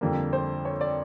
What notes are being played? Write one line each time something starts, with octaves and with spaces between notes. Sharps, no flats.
F2 D3 G3 A#3
C5
C#5
D5